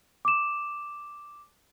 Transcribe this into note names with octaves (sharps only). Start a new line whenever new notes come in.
D6 E7